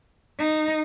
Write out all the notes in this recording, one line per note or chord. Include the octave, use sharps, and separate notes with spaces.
D#4